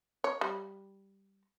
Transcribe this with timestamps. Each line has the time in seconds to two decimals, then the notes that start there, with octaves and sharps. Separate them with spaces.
0.24 C#5
0.41 G3